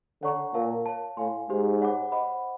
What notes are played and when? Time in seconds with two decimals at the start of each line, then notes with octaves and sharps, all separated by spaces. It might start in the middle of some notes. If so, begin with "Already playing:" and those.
0.22 D3 C#5 F#5 A#5 C#6
0.54 A#2 A#4 C#5 F5 A5
0.86 C#5 F5 A5
1.17 A2 C#5 F5 G#5 C6
1.49 G#2 D#4 G4 C5
1.81 C#5 F#5 B5 D6
2.12 C5 D#5 F#5 B5 D6